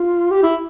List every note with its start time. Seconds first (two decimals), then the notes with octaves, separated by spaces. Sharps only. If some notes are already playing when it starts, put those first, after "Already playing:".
Already playing: F4
0.31 G4
0.43 E4